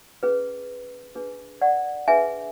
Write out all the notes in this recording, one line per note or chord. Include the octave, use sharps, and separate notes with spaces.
C#4 G#4 B4
D4 G#4 B4
D5 F#5
D4 G#4 B4 E5 G#5